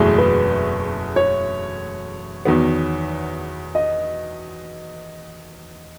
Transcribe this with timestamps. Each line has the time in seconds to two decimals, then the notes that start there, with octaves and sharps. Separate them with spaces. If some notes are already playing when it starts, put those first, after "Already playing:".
Already playing: F#1 E2 B2 A3 E4 G#4
0.18 B4
1.16 C#5
2.45 E2 D#3 F#3 B3
3.75 D#5